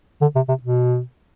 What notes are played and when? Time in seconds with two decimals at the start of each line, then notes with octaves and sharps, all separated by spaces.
0.21 D3
0.35 C3
0.49 C3
0.63 B2